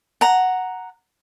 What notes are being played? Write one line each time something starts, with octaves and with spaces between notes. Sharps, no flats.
F#5 A#5